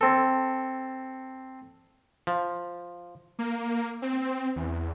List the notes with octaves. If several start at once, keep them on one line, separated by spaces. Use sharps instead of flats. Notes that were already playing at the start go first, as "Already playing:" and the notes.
C4 A4
F3
A#3
C4
E2